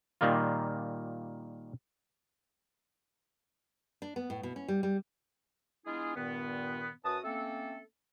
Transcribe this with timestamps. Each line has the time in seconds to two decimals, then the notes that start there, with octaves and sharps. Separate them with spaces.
0.21 A#2 D#3 G3 A#3 F4
4.02 D4
4.16 B3
4.30 A2
4.43 B2
4.56 C#4
4.68 G3
4.83 G3
5.86 G#3 B3 D4 E4 F4 G#4
6.16 G2 A#2 D#3 B3
7.05 F#2 F#4 B4 A5 D#6
7.24 A3 A#3 C4 C#4 A4